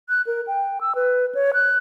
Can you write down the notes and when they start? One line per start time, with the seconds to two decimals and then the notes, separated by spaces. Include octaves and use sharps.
0.09 F#6
0.27 A#4
0.47 G5
0.81 E6
0.95 B4
1.35 C#5
1.54 F#6